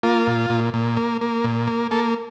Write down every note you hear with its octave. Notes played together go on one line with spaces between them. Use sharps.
A#3 F4
A#2
A#2
A#2
A#3
A#3
A#2
A#3
A#3 A4